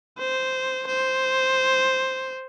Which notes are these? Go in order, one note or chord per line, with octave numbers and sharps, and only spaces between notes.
C5
C5